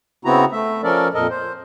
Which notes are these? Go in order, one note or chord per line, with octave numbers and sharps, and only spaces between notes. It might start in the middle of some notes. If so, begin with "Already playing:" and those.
C#3 B3 C4 E4 F#4 A#5
A3 E5
F3 C#4 A4 A#4 D5
F2 A#2 A4 A#4 D#5
C5